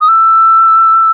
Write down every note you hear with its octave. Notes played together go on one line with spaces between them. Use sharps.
D#6
E6